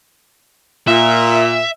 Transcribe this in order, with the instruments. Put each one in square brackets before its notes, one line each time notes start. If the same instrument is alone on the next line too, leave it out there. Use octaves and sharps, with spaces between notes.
[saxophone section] A#2 [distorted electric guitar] E5